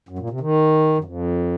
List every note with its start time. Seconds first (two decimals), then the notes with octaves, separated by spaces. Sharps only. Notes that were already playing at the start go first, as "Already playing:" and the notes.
0.09 F#2
0.19 A#2
0.30 C3
0.41 D#3
0.98 F#2
1.04 F2